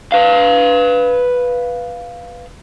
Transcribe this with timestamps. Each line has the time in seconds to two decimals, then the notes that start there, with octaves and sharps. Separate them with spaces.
0.12 B4 F5